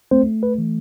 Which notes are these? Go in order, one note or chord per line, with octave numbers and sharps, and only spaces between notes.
A3 C4 C5
B4
E3